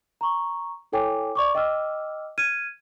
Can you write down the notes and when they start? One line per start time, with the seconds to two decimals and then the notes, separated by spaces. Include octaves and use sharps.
0.21 A#5 C#6
0.92 E4 A4 C#5 G5 G#5 D6
1.35 D5 C#6 D6
1.55 D#5 G5 D6 E6 F6
2.38 F6 G#6 D#7